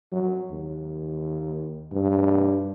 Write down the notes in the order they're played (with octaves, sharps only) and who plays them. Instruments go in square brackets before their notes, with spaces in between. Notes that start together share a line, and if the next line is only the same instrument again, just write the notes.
[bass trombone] F#3
D#2
G2